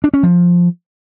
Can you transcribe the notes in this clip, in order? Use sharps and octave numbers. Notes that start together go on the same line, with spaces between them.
D4
C#4
F3